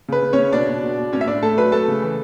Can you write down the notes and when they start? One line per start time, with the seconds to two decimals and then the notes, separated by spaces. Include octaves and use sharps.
0.09 C#3 B4
0.22 C#3
0.33 C#4 C#5
0.38 C#3
0.52 B2 D4 D5
0.68 B2
0.83 B2
0.98 B2
1.12 A2 C#4 C#5
1.21 E5
1.28 A2 D4 D5
1.43 A3 A4 A5
1.57 F#3 B4 B5
1.72 A3 A4 A5
1.88 C#3
2.02 E3